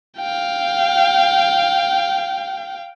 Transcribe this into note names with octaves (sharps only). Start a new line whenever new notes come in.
F5 G5